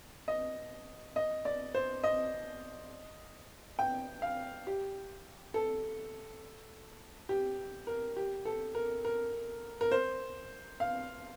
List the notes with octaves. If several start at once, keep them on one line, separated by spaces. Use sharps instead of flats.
D#5
D#5
D5
C5
D#5
G5
F5
G4
A4
G4
A#4
G4
A4
A#4
A#4
A#4
C5
F5